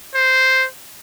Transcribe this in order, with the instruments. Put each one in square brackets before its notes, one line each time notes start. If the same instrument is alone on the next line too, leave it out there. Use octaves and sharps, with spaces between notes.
[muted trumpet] C5